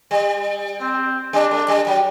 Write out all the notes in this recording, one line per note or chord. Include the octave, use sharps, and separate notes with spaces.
G3
C4
G3 D4
A3
G3
F#3